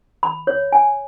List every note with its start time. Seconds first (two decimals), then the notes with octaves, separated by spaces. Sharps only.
0.23 B5
0.47 C#5
0.73 G#5